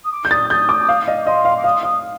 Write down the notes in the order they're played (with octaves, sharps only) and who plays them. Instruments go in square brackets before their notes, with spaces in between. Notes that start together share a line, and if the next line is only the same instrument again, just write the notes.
[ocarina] D#6
D6
[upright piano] G6
[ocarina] D#6 [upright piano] A6
[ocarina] D#6 [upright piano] G6
[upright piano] D6
F5
D#5
[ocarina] D6
[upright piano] D#5 [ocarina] C6
[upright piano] F5
[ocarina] D6
[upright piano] F5 [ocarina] D#6
[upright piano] F5 [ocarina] D#6